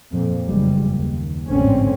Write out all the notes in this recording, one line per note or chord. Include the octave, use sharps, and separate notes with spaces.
F2 A#2
F#1 E2 G3 G#3
D#2
A1 F2 G#2 D3 C4 C#4